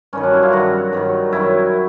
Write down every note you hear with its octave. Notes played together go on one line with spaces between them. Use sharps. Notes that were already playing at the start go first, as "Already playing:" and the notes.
G2 D#3 F#3 C#4
D4
E4
F4
G2 D#3 F#3 F#4
G2 D#3 F#3
F#2 D#3 F#3 E4